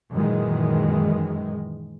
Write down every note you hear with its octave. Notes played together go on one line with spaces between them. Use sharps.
F#2 A#2 D#3 E3 G#3